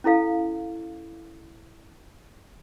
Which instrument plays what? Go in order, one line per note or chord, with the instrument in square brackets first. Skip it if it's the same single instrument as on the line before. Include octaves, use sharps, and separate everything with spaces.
[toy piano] C#4 E4 A4 F5